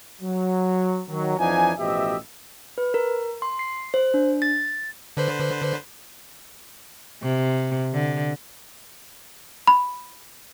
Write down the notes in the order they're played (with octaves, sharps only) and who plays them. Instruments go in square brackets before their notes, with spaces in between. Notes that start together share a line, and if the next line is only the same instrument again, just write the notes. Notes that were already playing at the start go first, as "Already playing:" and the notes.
[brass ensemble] F#3
D#3 F#3
F2 E3 F3 D4 D#4 G#5
A1 B2 F3 G4 D#5 E5
[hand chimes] B4
A#4
C6
C7
C5
D4
A6
[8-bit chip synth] D3 B4 C5
[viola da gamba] C3
D3
[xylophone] B5